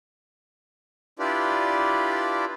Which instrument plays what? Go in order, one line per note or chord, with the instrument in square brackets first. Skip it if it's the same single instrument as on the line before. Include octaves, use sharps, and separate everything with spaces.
[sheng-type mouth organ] D4 E4 F4 G4 B4 D5